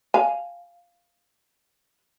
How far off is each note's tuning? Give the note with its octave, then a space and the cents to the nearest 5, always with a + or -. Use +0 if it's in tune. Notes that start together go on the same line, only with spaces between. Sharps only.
F5 +0 G#5 +0